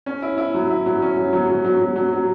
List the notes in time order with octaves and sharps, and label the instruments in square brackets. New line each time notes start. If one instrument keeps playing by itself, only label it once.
[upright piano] C#4
E4
E4
F#3
E4
F#3
C#4
F#3
F#3
F#3
F#3
F#3
F#3
F#3